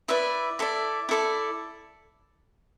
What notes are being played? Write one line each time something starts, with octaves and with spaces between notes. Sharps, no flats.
E4 B4 D5 E5
E4 A4 D5
E4 A4 D5